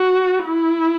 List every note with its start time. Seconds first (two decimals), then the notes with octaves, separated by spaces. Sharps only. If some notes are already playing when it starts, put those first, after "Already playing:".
Already playing: F#4
0.45 E4